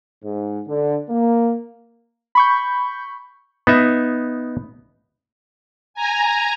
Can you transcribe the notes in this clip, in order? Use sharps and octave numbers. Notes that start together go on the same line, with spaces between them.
G#2
D3
A#3
B5 C#6 G6
B3 D#4 E5
G#5 A#5